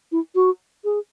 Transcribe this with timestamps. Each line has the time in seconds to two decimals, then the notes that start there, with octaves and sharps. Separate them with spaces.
0.12 E4
0.35 F#4
0.84 G#4